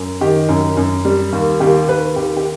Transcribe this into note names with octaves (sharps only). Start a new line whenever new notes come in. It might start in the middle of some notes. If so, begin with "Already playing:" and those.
Already playing: F#2
D#3 G4
F#2
F#2
G3
D#2
D#2 G4
D#2 B4
D#2 G4
G4